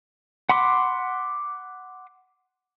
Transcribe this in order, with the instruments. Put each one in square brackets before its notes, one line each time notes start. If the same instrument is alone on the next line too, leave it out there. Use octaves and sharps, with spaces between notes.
[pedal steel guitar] F#5 B5 C6 D6